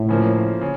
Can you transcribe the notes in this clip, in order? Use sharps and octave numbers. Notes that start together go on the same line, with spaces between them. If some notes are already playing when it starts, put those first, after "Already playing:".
Already playing: A2
C#3 F3 A#3
C#3